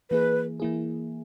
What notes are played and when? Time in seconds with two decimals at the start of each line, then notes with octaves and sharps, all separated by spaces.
0.11 E3 A#3 E4 G#4 B4
0.60 E3 A#3 E4 G#4